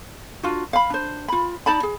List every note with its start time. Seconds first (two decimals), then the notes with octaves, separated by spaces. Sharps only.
0.43 D4 F4 F#4
0.73 F5 B5
0.90 D4 C5
1.28 F4 B5
1.66 D#4 D5 A5 B5
1.83 G#4